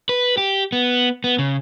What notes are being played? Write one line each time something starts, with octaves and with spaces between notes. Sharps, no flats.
B4
G4
B3
B3
C#3